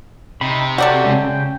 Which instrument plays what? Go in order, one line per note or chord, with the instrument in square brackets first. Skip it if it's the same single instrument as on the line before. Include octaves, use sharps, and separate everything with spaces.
[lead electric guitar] C3 [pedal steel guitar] D#4 B5
[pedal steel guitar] F#4 G4 [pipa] A4 D5 F#5
[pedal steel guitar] C#3 G#3
C#3 G5